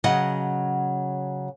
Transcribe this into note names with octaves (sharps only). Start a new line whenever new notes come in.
C#3 F#3 D#5 F#5